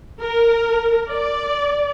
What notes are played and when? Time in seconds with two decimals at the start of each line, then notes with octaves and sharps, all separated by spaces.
0.20 A#4
1.12 D5